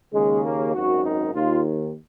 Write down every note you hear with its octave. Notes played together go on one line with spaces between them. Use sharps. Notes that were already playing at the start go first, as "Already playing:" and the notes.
D#2 C#3 G#3
A#3
G#1 F#2 D#3 F#4
D#4
D#2 D#3 F4